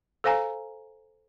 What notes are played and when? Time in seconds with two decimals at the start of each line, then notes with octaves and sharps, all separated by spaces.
0.24 A4 C5 F5 G#5 A#5